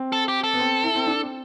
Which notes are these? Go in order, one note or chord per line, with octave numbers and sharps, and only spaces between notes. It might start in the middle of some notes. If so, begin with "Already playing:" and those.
Already playing: C4
A4
G4
A4
B3
C4
E4
C4
D4
C4